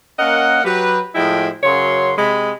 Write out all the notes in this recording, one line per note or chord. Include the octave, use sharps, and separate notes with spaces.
A#3 C#4 A#4 D#5 F#5
F#3 G4 B4
A2 F3 G#3 E4 G#4 G5
F#2 C#3 F#3 C#5 C6
C3 G#3 B5